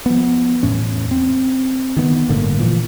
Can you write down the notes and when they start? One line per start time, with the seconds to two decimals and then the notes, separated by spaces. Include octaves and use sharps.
0.06 F3 B3
0.63 E2 A2 C#4
1.11 C4
1.97 D#3 B3
2.28 G1 A2 D3 A#3
2.59 A#2 E3 F3